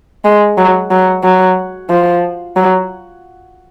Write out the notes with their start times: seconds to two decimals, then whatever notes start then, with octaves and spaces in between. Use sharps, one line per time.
0.25 G#3
0.57 F#3
0.91 F#3
1.24 F#3
1.90 F3
2.56 F#3